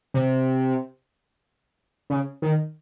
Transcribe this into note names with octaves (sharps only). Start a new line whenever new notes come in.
C3
C#3
D#3